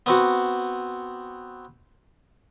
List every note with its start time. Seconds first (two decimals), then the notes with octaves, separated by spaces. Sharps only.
0.06 B3 C4 F#4